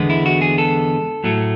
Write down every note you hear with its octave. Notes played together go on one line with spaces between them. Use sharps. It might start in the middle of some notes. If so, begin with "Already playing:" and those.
Already playing: E2 D3 G#3 B3
E4
F#4
G#4
A4
A2 F#3 A3